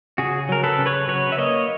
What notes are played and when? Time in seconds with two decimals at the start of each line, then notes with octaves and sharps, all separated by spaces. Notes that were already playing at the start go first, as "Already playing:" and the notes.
0.18 C#3 F#4 G#4
0.49 F#3 A#4
0.64 A4 B4
0.78 C#3
0.86 B4 C#5
1.08 F#3 B4 C#5
1.32 E5
1.38 A#3 C#5 D#5